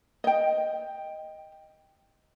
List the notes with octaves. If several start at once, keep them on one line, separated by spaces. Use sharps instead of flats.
D#5 G5